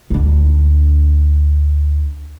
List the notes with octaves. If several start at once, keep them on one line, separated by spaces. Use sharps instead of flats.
D2 D4